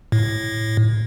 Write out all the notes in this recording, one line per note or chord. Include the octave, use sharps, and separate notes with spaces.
A2